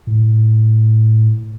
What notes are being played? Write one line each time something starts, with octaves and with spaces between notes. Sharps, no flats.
A2